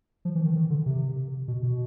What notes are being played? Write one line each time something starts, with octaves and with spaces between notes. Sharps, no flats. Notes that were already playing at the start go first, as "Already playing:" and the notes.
F3
E3
D#3
D#3
D3
C3
B2
B2